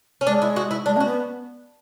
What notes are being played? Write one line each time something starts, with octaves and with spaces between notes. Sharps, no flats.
C#4
G#3 D4
E4
F#4
E4
G#3 D4
C#4 F#4
B3